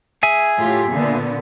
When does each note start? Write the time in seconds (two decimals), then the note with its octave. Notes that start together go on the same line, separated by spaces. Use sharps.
0.23 G#4 E5 G#5
0.60 A2 F4 G4
0.90 A#2 D3 B3